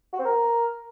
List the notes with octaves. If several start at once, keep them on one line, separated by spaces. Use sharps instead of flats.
F#4
C4
A#4